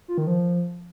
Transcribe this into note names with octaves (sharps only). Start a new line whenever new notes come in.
F4
D#3
F3